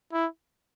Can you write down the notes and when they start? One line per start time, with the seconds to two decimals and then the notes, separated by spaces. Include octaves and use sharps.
0.13 E4